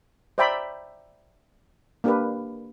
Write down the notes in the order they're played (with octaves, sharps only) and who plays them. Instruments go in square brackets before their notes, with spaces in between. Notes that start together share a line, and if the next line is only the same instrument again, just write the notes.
[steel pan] C5 D5 E5 G5 A#5 B5
A#3 D4 G4 A#4 B4